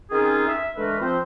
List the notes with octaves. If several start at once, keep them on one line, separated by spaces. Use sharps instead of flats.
D#3 C4 C#4 D#4 F4 G#4
E5
D3 E3 G#3 A3 A#4 B4
F3 C4 C5